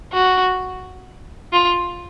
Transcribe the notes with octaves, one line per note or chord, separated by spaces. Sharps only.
F#4
F4